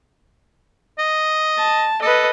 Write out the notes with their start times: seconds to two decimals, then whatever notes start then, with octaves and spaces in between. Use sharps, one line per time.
0.99 D#5
1.58 A5
2.02 A4 B4 D#5